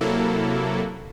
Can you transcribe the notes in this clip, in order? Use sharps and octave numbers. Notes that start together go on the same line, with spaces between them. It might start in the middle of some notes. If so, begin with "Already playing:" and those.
C3 F#3 A#3 E4 A4